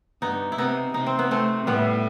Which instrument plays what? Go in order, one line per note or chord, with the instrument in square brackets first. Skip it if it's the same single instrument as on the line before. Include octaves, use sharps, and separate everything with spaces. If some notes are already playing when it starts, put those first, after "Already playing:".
[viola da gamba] G2 [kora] B3 D#4
[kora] E4
[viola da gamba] C3 [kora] B3 D#4
[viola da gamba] C3 [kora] D#4
[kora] C4
B3
A3 C4
[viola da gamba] A2 [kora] G3 B3